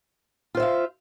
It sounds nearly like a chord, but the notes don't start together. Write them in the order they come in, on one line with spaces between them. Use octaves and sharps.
F4 C5 E5 F5